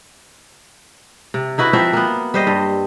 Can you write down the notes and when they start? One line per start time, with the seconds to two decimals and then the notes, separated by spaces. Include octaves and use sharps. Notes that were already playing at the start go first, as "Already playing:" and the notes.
1.34 C3
1.58 D#4 E4 F#4 B4
1.73 F3 C4 F#4 E5
1.93 A#3 B3
2.34 G3 C5 D#5
2.47 G2